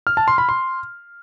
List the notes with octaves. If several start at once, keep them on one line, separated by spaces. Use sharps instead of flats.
F6
A5
C6
B5
C6